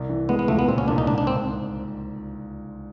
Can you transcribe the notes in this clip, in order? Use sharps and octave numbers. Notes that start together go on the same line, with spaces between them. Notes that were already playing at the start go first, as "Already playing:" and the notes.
Already playing: C2
E3
G#3 B3
B3
C#2 A3
B3
A#2 C4
C#4
C2 D4
D#4
G#2 D4
D4
C4